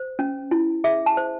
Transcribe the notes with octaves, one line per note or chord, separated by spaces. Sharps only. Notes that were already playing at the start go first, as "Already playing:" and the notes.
Already playing: C5
C#4
E4
G#4 E5
A5
C5